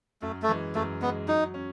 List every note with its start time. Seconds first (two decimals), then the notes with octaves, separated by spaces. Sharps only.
0.22 F#2 A3
0.42 A3
0.48 E3 G#3
0.75 F#2 A3
1.01 E3 G#3 B3
1.28 F#3 D#4
1.54 C#4